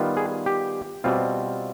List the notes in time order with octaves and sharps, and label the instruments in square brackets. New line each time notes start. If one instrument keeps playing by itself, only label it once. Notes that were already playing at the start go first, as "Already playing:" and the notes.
Already playing: [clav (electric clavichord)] D#3 G3 B3 F4
G#4
G4
B2 G3 C4 F4